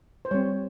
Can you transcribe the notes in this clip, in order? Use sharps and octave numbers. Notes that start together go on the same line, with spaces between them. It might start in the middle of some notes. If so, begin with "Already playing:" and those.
C5
G3 C4 C#5